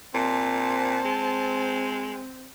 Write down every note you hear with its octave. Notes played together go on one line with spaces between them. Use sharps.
A#2 C4 A5
G#3